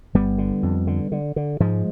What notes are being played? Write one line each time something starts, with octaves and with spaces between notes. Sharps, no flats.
G1 G3 B3
D3
F2
D3
D3
D3
G#2 F3 G#3